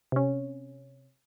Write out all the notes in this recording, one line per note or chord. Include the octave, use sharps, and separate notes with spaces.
C3 C#4